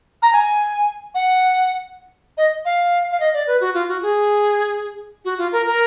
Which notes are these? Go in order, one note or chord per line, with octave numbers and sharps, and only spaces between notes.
A#5
G#5
F#5
D#5
F5
F5
D#5
D5
B4
F#4
F4
F#4
G#4
F#4
F4
A#4
A#4